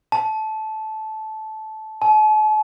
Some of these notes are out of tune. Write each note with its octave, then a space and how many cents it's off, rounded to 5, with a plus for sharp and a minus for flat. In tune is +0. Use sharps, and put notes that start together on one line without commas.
A5 -15
A5 -45